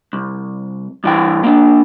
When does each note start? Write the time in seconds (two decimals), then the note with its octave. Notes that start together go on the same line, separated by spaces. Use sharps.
0.13 C2
1.04 G2 E3 G5
1.44 A#3 D4